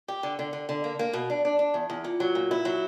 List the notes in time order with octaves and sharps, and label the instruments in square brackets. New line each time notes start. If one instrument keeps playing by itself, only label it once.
[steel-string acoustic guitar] G4
D3
D3
D3
D3
A#3
A#3
B2
D4
D4
D4
E2
E2
A#2
F#3
A#2
E4
F#3